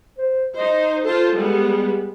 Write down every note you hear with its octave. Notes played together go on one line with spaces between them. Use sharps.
C5
D#4 C5 D#5
F4 A4 C5 A5
G3 G#3 B3